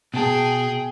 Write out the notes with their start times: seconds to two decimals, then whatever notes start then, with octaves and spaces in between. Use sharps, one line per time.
0.14 B2 G#4 G5 A5